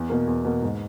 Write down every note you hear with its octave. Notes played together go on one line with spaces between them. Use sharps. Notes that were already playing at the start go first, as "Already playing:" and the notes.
Already playing: E2
B2 A#3
E2
B2 A#3
G#2